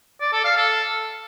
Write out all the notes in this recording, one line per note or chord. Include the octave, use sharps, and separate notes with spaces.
D5
A4
F5
A4